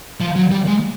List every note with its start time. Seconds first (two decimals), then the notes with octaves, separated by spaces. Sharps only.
0.21 F3
0.36 F#3
0.52 G3
0.67 G#3